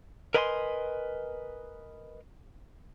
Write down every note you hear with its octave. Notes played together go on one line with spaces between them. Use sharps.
A#4 B4 D#5 G#5 A5 C6